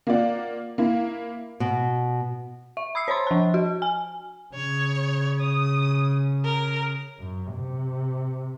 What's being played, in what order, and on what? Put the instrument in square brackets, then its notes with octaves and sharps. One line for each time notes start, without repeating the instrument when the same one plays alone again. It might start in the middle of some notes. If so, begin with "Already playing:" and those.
[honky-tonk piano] A#3 F4 D5 F#5
A#3 E4
[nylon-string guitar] B2
[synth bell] E5
B5 D#6 E6 C7
C5 C#5 B5 C6
F3 A5
F#4
G#5
[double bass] C#3 [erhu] C#5
[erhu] D#6
A#4
[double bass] F#2
C3